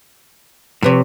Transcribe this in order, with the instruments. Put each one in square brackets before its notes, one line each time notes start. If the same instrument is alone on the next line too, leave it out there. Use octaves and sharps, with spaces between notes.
[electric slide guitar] A2 C3 [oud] F3 B4 C#5